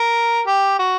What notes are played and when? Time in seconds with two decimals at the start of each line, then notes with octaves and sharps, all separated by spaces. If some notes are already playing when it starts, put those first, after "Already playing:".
Already playing: A#4
0.47 G4
0.79 F#4